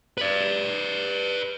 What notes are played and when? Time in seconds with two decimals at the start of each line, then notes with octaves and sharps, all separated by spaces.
0.18 B4 D5